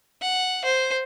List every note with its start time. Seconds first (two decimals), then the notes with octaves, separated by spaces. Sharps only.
0.22 F#5
0.65 C5